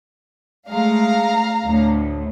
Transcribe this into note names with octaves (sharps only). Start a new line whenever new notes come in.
G#3 A3 F5 A#5
D2 A2